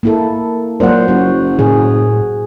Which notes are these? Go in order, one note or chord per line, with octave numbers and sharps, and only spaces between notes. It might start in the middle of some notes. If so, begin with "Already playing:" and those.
A#3 E4 A4
A#2 F#3 C5 F#5
F#1 F#4
A2 G#4